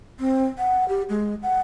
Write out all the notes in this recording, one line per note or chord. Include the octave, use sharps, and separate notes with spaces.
C4
F#5
G4
G#3
F#5